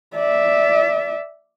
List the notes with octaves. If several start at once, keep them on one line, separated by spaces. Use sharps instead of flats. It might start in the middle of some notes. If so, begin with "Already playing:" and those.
D5 E5